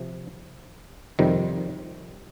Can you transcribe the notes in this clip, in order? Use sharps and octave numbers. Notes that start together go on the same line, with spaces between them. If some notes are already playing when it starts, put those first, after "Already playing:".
Already playing: C3 F3
F2 C3 D#3 G3